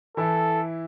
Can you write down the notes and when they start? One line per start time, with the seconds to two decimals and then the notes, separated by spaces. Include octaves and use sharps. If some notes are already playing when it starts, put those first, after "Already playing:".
0.17 E3 E4 A4